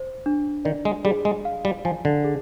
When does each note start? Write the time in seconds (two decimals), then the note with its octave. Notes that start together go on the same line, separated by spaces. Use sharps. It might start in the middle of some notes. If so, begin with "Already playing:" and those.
Already playing: C5
0.26 D4
0.65 D#3 D5
0.85 G#3
1.05 G3 G#4
1.25 G#3
1.45 F5
1.65 G3
1.85 F3 G#5
2.05 D3
2.24 G#4